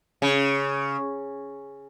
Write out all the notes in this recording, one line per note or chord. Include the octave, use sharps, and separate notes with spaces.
C#3